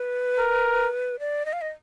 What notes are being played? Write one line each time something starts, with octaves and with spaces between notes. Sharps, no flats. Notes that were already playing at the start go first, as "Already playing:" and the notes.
Already playing: B4
A#4
D5
D#5
F5
D#5